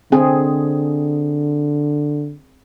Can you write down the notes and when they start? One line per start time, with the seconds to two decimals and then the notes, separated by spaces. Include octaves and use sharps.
0.12 D3 C4 G#4